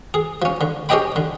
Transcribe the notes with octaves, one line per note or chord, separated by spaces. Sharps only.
G#4
F3 C#4
D3
C#4 G4 G#4 D#5 G5 B5
D3